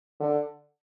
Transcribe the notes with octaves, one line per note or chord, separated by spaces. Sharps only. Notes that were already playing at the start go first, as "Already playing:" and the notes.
D3